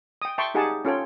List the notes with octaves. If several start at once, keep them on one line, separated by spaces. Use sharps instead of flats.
G5 D#6
E5 G5 A5 C6 C#6
D#4 G4 G#4 F#5 G#5 A5
C#4 F4 A4 C#5 G5